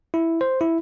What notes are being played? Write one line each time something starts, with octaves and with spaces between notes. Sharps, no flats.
E4
C5
E4